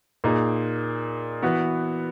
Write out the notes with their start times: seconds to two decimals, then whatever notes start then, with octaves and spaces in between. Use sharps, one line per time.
0.24 A#2 A#3 D#4 G#4
1.42 E3 B3 F#4 B4